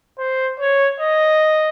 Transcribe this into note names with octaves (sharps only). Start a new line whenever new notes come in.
C5
C#5
D#5